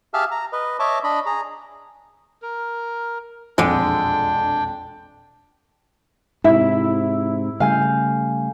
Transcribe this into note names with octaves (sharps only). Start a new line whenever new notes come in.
G4 G#4 E5 F5 A5 F6
A#5
B4 D#5
C#5 D#5 E5 A5 C#6 D6
D4 D#5 B5
G#4 A#5
A#4
E1 A#1 F2 D3 G#3 D4 G5
G#2 C3 E4 E5
C#3 G3 A3 F5 G#5 G6